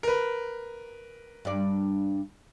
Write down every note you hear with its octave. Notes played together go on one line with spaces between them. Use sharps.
A#4 B4
G2 D5